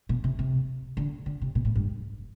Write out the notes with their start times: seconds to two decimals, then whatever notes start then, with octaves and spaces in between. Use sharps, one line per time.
0.09 B2
0.24 C3
0.39 C3
0.97 D3
1.26 D3
1.42 C3
1.55 B2
1.65 A2
1.75 G2